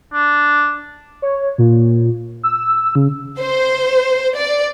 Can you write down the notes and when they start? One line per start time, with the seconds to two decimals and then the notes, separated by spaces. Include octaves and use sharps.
0.13 D4
1.22 C#5
1.58 A#2
2.43 E6
2.95 C#3
3.38 C5
4.35 D5